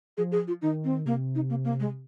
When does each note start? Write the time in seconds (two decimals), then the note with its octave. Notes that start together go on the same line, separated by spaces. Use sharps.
0.17 F3 G#4
0.32 G#4
0.48 F4
0.62 D#3 D#4
0.84 C4
1.05 C3 A#3
1.35 D#4
1.50 A#3
1.64 A#3
1.80 G#3